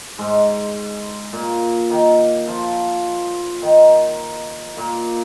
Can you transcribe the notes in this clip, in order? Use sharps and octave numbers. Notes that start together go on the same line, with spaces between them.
G#2 G#3
A#2 A#3
D#3 D#4
F3 F4
D#3 D#4
A#2 A#3